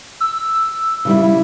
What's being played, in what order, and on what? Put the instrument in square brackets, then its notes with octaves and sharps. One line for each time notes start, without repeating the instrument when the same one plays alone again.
[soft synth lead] E6
[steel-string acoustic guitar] C#3 G3 E4